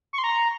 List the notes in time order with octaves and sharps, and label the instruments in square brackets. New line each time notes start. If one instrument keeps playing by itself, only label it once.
[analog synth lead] C#6
C6
A#5